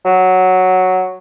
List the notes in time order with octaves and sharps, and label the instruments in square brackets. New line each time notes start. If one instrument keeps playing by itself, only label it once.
[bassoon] F#3